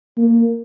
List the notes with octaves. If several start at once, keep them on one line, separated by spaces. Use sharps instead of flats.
A#3